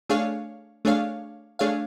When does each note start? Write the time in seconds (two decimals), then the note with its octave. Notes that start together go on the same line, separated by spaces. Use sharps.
0.09 A3 D4 G#4 C#5 F5
0.85 A3 D4 G#4 C#5 F5
1.59 A3 D4 G#4 C#5 F5